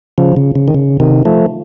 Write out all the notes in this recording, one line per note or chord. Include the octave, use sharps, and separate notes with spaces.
C#3 F3
C#3
C#3
D#3
C#3
C3 D#3
F3 A3